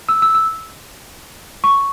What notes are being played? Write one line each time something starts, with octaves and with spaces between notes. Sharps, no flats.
E6
E6
E6
C#6